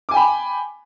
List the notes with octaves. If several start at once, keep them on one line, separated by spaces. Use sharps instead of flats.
G5 G#5 B5 D6